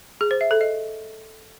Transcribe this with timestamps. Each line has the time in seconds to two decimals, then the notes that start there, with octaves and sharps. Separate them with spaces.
0.21 G#4
0.31 C5
0.41 E5
0.51 A4
0.61 D#5